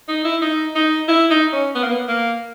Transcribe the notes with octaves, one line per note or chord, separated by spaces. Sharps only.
D#4
E4
D#4
D#4
E4
D#4
C#4
B3
A#3
B3
A#3